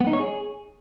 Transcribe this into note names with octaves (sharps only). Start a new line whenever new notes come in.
B3
D#4
C#5
G#4